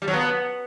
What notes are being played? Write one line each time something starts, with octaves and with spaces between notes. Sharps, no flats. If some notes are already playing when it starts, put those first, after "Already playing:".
G3
F#3
B3